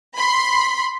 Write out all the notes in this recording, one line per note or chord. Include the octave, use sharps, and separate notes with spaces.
B5 C6